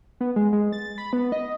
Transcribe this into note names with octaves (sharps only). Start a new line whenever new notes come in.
B3
G#3
G#3
A6
B5
B3
D#5